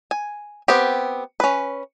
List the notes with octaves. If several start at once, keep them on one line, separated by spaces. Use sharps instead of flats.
G#5
B3 C4 G4
C#4 B4